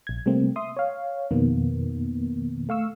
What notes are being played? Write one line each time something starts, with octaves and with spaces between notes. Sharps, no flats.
A#1 G#6
C3 G3 A3 A#3 C4
E5 C6 D#6
C#5 F5
F2 B2 D#3 A#3 B3
A3 F5 C#6 E6